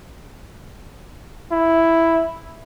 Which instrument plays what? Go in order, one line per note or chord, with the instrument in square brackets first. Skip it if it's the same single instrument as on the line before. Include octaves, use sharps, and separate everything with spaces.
[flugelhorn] E4